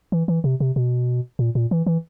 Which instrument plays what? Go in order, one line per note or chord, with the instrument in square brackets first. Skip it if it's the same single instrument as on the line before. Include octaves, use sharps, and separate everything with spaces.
[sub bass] E3
E3
C3
C3
B2
A#2
A#2
E3
E3